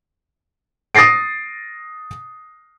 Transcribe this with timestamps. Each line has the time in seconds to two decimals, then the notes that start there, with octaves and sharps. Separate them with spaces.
0.95 D#6 A6 A#6 C7 D7